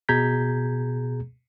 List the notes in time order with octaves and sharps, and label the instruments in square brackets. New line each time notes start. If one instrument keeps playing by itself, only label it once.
[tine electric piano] B2 G#4 A#5 G6 G#6 B6